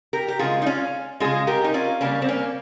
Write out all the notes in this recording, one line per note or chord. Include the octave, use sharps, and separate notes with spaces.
G4 A#4
G4
C#3 G#3 F4 G#4
D#4
C#4 F4
C#3 G#3 F4 G#4
G4 A#4
D#4
C#4 F4
C#3 G3 A#3 C#4
C4
A#3 C#4